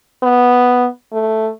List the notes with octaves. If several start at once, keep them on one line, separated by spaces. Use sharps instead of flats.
B3
A3